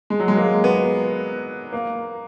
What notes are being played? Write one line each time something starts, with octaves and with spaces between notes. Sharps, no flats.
G#3
F#3
G#3
A#3
B3
A#3